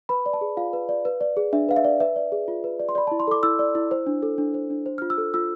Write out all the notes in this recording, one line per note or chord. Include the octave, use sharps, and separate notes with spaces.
B4 B5
D5
A5
G#4
F4 F5
B4
D5
B4
D5
G#4
D4 E5
B4 F5
E5
D5
B4 E5
D5
G#4
F4
B4
D5
C6
D5 B5
E4 A5
C6
A4 D6
E4 E6
D5
E4
C5
D4
A4
D4
C5
D4
C5
F4 F6
E6
A4
F4 E6